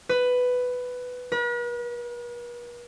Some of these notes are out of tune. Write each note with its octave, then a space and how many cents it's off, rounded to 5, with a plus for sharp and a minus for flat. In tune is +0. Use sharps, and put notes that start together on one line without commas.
B4 +10
B4 -45